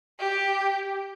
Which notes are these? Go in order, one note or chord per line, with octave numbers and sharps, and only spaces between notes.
G4